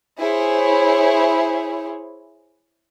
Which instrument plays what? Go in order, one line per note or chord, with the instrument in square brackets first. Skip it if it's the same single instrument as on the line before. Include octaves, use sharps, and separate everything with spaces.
[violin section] E4 G#4 C5 C#5